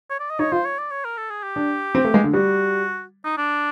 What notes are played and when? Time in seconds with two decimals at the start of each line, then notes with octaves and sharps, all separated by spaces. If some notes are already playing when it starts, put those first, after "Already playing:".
0.10 C#5
0.20 D5
0.30 D#5
0.39 D#4 C#5
0.52 F4 C5
0.65 C#5
0.78 D5
0.91 C#5
1.05 A#4
1.17 A4
1.30 G#4
1.43 G4
1.56 D4
1.95 C4
2.05 A3
2.14 G#3
2.24 D3
2.33 G3 F#4
3.25 D#4
3.38 D4